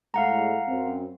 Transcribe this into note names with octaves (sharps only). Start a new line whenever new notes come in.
A2 G#3 F5 F#5 A#5
F#2 C4